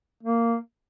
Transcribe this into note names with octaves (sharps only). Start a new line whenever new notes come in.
A#3